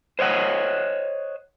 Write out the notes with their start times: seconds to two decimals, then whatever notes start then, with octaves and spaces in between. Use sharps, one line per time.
0.19 C5 C#5 D#5 F#5